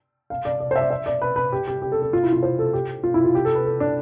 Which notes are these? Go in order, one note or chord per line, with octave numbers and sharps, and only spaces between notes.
F5
D5
D5
C5
E5
D5
E5
D5
B4
B4
G4
G4
G4
A4
A4
F4
E4
F4
C5
A4
G4
F4
E4
F4
G4
A4
B4
A4
D4